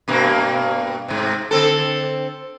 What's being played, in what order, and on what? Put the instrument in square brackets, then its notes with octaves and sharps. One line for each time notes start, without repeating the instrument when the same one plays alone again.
[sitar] G2 B2 A#3
G#2 C3
D3 C4 A4